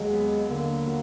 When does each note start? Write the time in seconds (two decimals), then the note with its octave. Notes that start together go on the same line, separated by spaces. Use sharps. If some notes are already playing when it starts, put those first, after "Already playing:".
Already playing: D#2 F#3 G#3
0.13 B3
0.49 D3 A#3
0.87 F#3